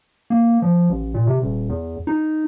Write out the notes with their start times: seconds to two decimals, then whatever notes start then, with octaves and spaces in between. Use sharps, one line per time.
0.30 A#3
0.62 F3
0.89 A1
1.14 A#2
1.27 C3
1.42 D#1
1.69 E2
2.07 D#4